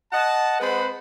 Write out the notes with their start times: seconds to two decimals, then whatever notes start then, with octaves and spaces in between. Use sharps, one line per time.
0.12 D#5 F#5 A5
0.60 G#3 C4 B4 C5 F#5 B5